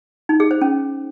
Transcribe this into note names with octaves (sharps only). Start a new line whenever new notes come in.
D#4
G#4
C5
C#4